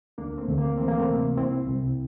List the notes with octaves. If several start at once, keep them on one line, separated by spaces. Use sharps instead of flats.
D2 A#3 D4
A3 C4
D2
A#3
E3 C4
A#3
A3 C4
C3
C2 C4 E4
C2